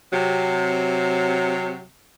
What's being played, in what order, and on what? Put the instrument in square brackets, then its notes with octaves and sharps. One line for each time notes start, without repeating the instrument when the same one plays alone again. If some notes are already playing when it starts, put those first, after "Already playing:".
[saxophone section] C3 F#3